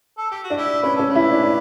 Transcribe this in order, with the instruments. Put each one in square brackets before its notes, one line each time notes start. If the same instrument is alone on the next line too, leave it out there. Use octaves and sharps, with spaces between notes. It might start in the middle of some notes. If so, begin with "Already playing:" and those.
[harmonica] A4
G4
F#4
[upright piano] D4
[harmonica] E4 G4
[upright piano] C#4 [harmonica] B4
[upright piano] C#4 [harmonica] A4
[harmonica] G4 B4
[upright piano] E4
D4
D4